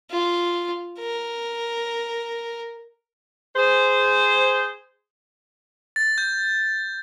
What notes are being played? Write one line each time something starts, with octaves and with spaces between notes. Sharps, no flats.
F4
A#4
G#4 C5
A6
G6